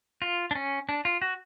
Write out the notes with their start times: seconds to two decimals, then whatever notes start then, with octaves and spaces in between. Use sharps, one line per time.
0.22 F4
0.51 D4
0.55 C#4
0.89 D4
1.05 F4
1.22 F#4